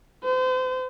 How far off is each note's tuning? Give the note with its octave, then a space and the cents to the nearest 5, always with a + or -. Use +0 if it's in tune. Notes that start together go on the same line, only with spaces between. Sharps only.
C5 -35